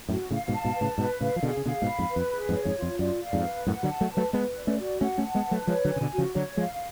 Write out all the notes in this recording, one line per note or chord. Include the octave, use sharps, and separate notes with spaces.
F#2 A2 F#4
A2 C#3 F5
G#2 B2
A5
G#2 B2
B4
A2 C#3
G#2 B2 B4
A2 C#3 F5
F3
B2 D3 G#4
C#3
B2 D3 F5
G#2 B2
B5
F2 G#2
B4
F2
G#4
F2 G#2
C#5
F2 G#2
F2 F4
F#2 D5
F5
F2 G#2
B4
F#2 A2 F#5
D3 F#3
A5
F#3 A3
B4
F#3 A3
G#3 B3 B4
D5
A3 C#4
F#4
A3 C#4 F#5
A3 C#4
A5
G#3 B3
B4
F#3 A3
F3 G#3 C#5
D3 F#3
G#5
C#3
B2 D3
F#4
C#3 F3
D3 F#3 C#5
F3 G#3 F5